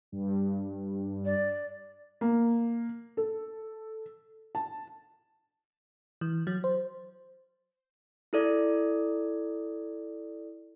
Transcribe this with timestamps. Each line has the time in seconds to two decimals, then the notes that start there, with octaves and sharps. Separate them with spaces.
0.12 G2
1.25 D5
2.21 A#3
3.17 A4
4.55 A5
6.21 E3
6.47 F#3
6.64 C5
8.33 E4 A4 D5